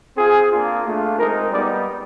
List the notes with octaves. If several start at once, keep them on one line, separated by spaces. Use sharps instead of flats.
C4 F4 G#4
A#3 D4 F4
A3 D4 F4
G#3 C4 D#4 A#4
G3 B3 D#4 G4 D5